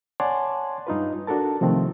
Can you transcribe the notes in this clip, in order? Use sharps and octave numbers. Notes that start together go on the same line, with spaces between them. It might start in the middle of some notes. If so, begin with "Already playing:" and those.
C#5 D5 F#5 G#5 A5 C6
G2 D#4 F4 B4
D4 F#4 A4 A#4 A5
C3 D#3 F3 A3 C4